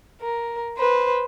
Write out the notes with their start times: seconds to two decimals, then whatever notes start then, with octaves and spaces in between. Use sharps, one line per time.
0.21 A#4
0.78 B4 C5